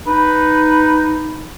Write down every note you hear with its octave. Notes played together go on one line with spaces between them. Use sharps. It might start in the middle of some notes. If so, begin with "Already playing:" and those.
D#4 B4